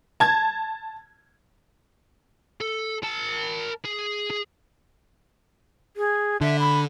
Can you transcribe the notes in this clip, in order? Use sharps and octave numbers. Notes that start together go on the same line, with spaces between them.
A5 G#6
A4
A#4 A5
G#4
G#4
G#4
D3 E5
B5